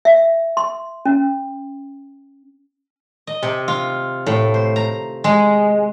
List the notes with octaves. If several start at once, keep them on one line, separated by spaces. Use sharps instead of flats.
E5
C6
C#4
D#5
C3
F4
A2
C5
A#5
G#3